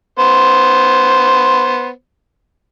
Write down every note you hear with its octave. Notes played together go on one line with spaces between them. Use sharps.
B3 C5